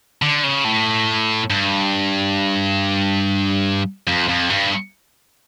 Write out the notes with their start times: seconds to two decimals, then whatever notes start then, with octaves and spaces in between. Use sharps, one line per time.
0.22 D3
0.43 C#3
0.65 A2
1.50 G2
4.07 F2
4.28 F2
4.50 G2